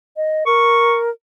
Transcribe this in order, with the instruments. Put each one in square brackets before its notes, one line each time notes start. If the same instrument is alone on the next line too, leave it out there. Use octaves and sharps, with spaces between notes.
[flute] D#5
[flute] A#4 [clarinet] C#6